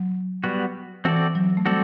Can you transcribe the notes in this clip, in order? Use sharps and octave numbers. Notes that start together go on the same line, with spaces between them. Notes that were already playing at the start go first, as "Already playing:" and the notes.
Already playing: F#3
G3 B3 F#4
E3 C4 F#4 A4 D5
F#3
A3
G3 C4 F#4 A4 D5